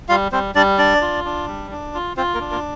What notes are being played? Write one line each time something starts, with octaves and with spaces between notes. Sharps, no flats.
G3 F4 F5
G3 C4 C5
G3 D4 D5
D4 D5
F4
D4
G3
D4
F4
C4 F4 C5
A#3 A#4
D4
A#3 A#4